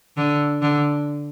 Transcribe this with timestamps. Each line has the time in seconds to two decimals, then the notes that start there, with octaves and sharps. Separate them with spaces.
0.17 D3
0.61 D3